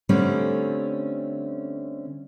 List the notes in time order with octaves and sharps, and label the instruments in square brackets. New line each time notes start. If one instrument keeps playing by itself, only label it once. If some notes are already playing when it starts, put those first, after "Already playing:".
[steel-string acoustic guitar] D3 G3 A3 C4 C#4